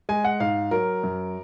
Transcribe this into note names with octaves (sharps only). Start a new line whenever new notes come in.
G#3 G#5
F#5
G#2 F5
F#3 A#4
F#2